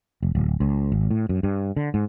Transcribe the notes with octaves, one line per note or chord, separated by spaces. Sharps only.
F1
D1
C#2
G#1
A2
F#2
G2
D3
G#2